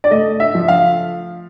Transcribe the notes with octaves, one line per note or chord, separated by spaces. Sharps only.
D5
A3 D#5
E5
F3
F5